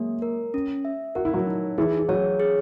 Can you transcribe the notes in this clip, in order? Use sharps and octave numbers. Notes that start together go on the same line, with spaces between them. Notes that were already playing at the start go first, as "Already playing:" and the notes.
Already playing: F#3 G#3 A#3 G#4
A#4
C#4
E5
F#4 A#4
E4
F#3 F#4
D#4
E3 E4 G#4
E4
F#3 F#4 C#5
G#4